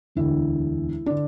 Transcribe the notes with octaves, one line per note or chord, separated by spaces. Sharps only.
E1 D2 D3 E4
D3 D4